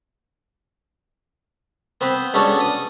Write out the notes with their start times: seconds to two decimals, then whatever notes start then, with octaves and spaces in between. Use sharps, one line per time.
2.01 B3 C4 B4 C5
2.34 G#3 B3 C#4 D4 F#4 A4
2.60 D#6